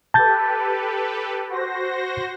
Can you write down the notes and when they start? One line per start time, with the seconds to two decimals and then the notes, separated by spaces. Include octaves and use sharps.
0.14 G4 A4 B4 A5 G6 A6
1.50 F#4 C5 A#6